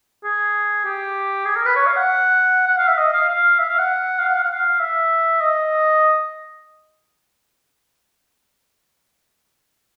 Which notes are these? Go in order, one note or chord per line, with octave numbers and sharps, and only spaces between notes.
G#4
G4
G#4
A#4
B4
C#5
F5
F#5
F#5
F5
E5
D#5
F5
F5
E5
F5
F#5
F5
F#5
F5
F#5
F5
E5
D#5